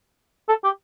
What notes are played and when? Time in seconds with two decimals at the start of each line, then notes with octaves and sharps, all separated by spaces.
0.49 A4
0.64 G4